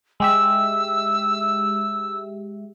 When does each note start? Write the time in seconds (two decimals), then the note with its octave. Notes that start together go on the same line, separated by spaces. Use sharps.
0.20 G#3 G4 E5 E6